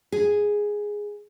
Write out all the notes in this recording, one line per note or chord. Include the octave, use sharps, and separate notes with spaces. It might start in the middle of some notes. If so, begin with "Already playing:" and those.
G#4